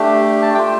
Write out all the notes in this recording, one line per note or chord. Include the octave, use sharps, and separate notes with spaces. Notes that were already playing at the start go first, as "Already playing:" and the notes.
Already playing: A3 D4 G4
A5
A3 F4 G5